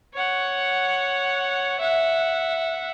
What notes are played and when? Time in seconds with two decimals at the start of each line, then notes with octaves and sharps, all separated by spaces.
0.14 C#5 F#5
1.80 E5 F#5